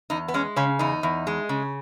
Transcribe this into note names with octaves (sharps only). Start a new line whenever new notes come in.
E2 D#4
B3
G#3 C#4
C#3 C#4
E2 D#4
E2
G#3
C#3